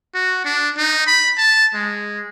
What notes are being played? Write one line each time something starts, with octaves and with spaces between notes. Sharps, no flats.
F#4
D4
D#4
B5
A5
G#3